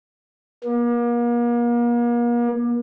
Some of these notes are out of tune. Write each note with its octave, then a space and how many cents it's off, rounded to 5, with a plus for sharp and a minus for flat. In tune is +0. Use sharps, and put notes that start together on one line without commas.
A#3 +40